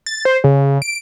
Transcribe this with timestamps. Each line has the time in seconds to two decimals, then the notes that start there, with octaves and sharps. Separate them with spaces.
0.06 A6
0.25 C5
0.44 C#3
0.82 D7